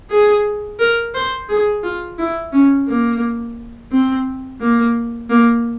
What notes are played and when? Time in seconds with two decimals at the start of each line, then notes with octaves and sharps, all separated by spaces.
0.11 G#4
0.80 A#4
1.14 C5
1.49 G#4
1.84 F4
2.19 E4
2.53 C#4
2.88 A#3
3.92 C4
4.61 A#3
5.30 A#3